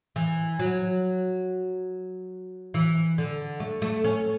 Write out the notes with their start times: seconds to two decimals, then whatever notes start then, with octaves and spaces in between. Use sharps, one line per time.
0.16 E3
0.59 F#3
2.74 E3
3.18 D3
3.60 A3
3.82 A3
4.04 C#4